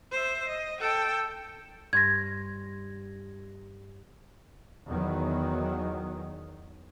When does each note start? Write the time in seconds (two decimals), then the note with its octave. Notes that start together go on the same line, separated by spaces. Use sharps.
0.12 C5 E5
0.46 D#5
0.80 A4 G5
1.93 G2 C6 G#6 A#6
4.86 E2 D#3 F#3